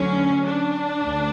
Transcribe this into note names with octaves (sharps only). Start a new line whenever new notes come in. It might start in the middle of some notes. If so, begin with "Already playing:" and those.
Already playing: D2 D3 F#3 C#4
D4
D2